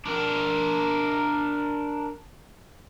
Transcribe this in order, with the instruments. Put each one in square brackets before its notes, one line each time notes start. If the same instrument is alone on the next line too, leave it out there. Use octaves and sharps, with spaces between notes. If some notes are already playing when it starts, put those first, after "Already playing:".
[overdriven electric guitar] D4 A#4